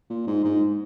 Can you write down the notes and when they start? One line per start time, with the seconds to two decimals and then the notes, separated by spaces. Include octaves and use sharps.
0.10 A#2
0.27 G#2
0.44 G#2